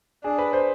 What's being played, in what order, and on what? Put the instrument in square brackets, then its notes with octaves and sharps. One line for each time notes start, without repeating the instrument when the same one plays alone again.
[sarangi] D4 [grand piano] G#4
[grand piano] B4
C5